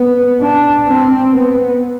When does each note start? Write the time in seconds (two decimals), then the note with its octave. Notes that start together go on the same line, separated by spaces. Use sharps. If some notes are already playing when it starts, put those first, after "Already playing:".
Already playing: B3
0.41 D4
0.87 C4
1.34 B3